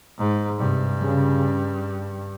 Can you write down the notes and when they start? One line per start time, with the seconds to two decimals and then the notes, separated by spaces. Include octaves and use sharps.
0.18 G#2
0.59 G2 C3
1.01 C#3